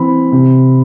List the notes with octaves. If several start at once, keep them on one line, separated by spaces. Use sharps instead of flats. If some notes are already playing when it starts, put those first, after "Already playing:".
Already playing: E3 C4 B5
C3